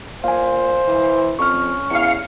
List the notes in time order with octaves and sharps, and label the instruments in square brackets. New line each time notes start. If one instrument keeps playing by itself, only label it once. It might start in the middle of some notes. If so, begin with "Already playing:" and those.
[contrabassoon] A#2 [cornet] C5 [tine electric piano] F5 G#5
[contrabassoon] E3
[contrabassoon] F2 [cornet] C#4 [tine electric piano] C#6 F6
[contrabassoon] E2 [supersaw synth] F5 C#7